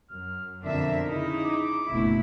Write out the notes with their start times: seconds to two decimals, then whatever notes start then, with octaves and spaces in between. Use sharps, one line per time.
0.10 F#2 F6
0.65 F2 B2 D3 D4 A#4 E5
1.06 C#3 D#4 E4
1.45 D6
1.89 F#1 D2 B2 A3 E4